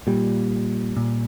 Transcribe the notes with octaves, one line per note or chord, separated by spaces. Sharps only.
A#2 G3
A#2